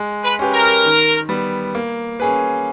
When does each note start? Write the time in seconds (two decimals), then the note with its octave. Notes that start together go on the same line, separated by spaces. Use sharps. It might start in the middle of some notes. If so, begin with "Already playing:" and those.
Already playing: G#3
0.24 B4
0.39 C#4 G4 B4
0.54 A#4
0.85 D#3
1.29 G3 B3
1.75 A#3
2.20 C#4 G#4 B4